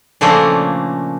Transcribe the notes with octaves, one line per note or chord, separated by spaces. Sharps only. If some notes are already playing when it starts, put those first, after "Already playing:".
A#2 C#3 F3 A3 A#3 D4